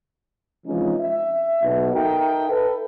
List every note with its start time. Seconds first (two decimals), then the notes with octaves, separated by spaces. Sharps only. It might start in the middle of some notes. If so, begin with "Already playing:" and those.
0.66 C3 E3 F3 G#3 C#4 D#4
0.99 E5
1.62 B1 B2
1.93 D#4 A4 A#4 E5 G5
2.49 A4 B4